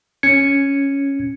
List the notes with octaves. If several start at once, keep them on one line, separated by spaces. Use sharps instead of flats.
C#4 G#6 C#7